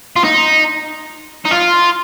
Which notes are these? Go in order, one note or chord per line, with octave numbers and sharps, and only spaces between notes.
F4
D#4
D#4
F4